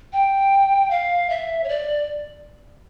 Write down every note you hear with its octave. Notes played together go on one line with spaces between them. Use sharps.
G5
F5
E5
C#5
D5